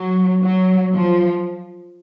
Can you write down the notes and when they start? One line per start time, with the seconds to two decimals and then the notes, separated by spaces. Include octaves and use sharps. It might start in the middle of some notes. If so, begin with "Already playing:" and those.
Already playing: F#3
0.43 F#3
0.93 F3